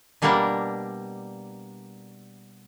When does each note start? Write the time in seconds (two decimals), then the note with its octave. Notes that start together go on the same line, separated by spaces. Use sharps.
0.22 B2 G3 A#3 D4 A#4 D5